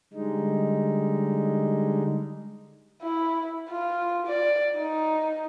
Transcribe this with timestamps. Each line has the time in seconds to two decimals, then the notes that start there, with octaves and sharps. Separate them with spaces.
0.13 D3 G3 G#3 D#4
3.02 E4
3.70 F4
4.27 D5
4.78 D#4